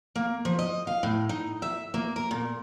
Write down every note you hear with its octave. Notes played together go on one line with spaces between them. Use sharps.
A#3
F3
D#5
F5
A2
D#4
E5
A#3
A#4
A#2